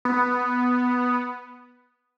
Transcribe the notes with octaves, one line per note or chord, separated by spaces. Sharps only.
B3